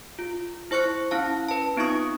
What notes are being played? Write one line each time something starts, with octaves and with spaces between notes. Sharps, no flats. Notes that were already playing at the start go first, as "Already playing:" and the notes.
F4
E4 C5 C#6 F#6 C#7
C#4 E4 F5 A5
B4 A5
B3 C4 D#4 F4 C#6 D#6